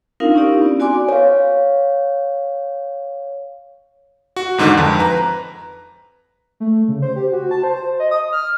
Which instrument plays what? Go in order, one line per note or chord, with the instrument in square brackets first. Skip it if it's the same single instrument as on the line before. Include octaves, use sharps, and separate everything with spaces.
[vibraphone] C4 D4 D#4 F4 A#4 F5
C4 C#4 D#4 E4 G4 D5
B3
F#4 D5 G#5 C6 D6
[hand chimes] C#5 F5
[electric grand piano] F#4
E2 G#2 D3 D#3
F2
B4 A#5
[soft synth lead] A3
C#3
C5
G4
F#4
A5
C5
D#5
D#6
F6